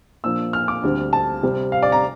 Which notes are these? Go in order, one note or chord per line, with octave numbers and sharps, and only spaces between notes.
A#2 F3 A#3 D4 E6
F6
D6
D2 D3 G3 C4
A5
C3 G3 C4
F5
D5
A#5